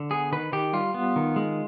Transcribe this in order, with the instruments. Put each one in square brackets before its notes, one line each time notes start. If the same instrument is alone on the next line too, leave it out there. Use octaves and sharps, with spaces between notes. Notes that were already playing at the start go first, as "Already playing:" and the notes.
Already playing: [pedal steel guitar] D3
B3 G#4
D#3 B4
D#3 G4
G3 F4
B3
D#3
G#3